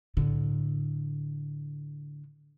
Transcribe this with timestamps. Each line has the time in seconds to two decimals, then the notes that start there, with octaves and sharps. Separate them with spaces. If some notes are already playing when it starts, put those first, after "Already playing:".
0.17 A2 D3